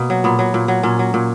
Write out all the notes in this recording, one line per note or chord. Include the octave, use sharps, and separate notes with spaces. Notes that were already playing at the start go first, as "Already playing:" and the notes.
Already playing: B2 A#3
F#3
A#2 B3
F#3
A#2
F#3
A#2 C#4
F#3
A#2